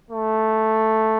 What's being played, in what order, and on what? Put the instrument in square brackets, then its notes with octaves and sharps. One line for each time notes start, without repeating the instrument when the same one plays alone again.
[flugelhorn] A3